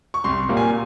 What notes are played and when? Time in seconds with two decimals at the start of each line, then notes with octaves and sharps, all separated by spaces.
0.14 C#6
0.24 C2 C6
0.49 A#2 G3 A#3
0.57 G#5